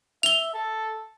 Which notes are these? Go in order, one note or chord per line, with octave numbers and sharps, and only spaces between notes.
E5 F7 G7
A4